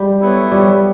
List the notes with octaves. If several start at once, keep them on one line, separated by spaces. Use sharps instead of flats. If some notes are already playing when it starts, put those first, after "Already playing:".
Already playing: G3
B3 E4 A4 C#5
G3